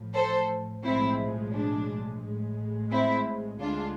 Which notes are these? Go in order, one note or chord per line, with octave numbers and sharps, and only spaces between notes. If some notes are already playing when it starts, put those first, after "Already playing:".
Already playing: A1 A2 F3
A4 C5
B1 A2 F3 G#3 C4 E4
D4
A1 A2 G#3
C4 E4
D2 D3 G#3 D4 F4